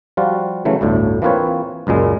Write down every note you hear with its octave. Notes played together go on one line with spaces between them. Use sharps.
F3 G3 F4 F#4
C#3 E3 F#3 A3
G1 D2 A2 D3
E3 A#3 C4 F4 B4 C#5
C#2 F#2 A#2 G#3